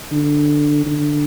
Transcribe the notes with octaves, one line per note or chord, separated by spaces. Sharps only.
D3
D3